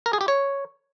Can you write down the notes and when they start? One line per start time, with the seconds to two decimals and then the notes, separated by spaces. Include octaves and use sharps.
0.06 A#4
0.13 G#4
0.21 G4
0.28 C#5